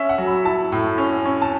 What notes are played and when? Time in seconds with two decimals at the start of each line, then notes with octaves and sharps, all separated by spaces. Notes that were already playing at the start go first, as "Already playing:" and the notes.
Already playing: C#4 E5
0.09 F#5
0.18 F#3
0.27 B5
0.45 E4 A5
0.72 A2
0.98 C#4
1.26 C#4
1.42 A5